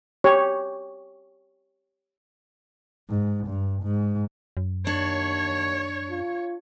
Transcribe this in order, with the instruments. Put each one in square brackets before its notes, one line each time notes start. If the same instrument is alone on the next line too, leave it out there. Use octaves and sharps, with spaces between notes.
[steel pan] G4 C#5
[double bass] G#2
G2
G#2
[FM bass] F#2
[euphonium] D#2 [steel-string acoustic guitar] D4 [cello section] C#5
[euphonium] F4